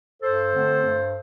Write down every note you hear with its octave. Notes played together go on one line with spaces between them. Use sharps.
G2 A4 C5
D3 A3 C4
G2